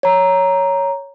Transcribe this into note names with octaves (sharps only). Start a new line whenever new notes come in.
C#5 A#5